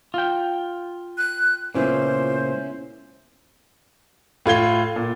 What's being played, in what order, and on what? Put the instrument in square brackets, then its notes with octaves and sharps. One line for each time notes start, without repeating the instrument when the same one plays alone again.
[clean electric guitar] F4 G5
[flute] F#6
[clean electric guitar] C#2 F#2 A#2 [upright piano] B3 C#4 E4 [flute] C5
[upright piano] A2 F4 G#6 G7
A#2